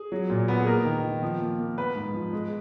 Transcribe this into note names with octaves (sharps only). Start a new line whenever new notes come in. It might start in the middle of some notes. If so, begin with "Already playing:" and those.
Already playing: G#4
F#3
A#2
B3
G#4
A#3 A#4
D#3
D#3
F3
A#3
A#3
B3 B4
G#2
F3
G#3